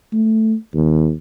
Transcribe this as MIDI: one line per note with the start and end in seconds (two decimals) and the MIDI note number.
0.13 0.55 57
0.74 1.13 39